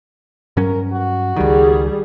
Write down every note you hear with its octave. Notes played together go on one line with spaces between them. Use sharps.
G2 F#3 C#4 A#4
F#4
C#2 D#3 G3 G#4